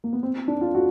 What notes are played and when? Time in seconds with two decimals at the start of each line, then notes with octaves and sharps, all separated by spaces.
0.04 A#3
0.13 B3
0.23 C4
0.48 D4
0.61 F4
0.75 F#4